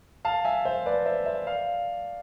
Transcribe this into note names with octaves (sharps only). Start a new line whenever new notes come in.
F5 A5
E5 G#5
C5 E5
B4 D5
C5 E5
C5 E5
D5 F5